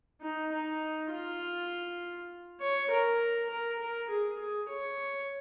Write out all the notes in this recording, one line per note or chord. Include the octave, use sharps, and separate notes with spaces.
D#4
D#4
F4
C#5
A#4
A#4
A#4
G#4
G#4
C#5